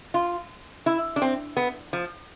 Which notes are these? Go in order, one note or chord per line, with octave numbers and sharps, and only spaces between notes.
F4
E4
D4
C4
B3
F3